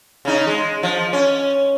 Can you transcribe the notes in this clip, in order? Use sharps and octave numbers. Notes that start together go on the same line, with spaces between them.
C#3 D#4
G#3
F3
C#4